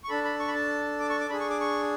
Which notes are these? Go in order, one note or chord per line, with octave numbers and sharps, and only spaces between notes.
C#6
D4 A4 B5
B5
C#6
B5
A5
D6
C#6
D6
D4 G#4 B5
C#6
D6
C#6